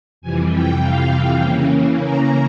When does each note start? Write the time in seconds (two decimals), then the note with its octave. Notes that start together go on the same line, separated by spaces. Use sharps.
0.22 F2 C3 E3 G3 G#5
0.52 G5
0.82 F5
1.12 G5
1.42 C#3 E3 A#3 C#4
2.03 A#5